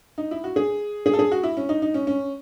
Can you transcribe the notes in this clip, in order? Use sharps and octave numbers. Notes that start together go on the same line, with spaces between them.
D#4
E4
F#4
G#4
G#4
A4
G#4
F#4
E4
C#4
D#4
D#4
C#4
C#4